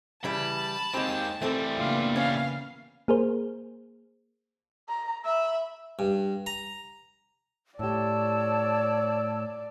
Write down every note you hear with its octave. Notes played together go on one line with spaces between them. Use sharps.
C#3 E3 G3 A5 B5
D#2 G#3 C4 G4
E3 G3 A3 C4 A4
C#3 A#3 B3 D4 F4
C#4 C#5 F5
A#3 G#4 A#4 C5
A#5
E5 B5 E6
G2
A#5
A2 G4 C#5 D5 A5 E6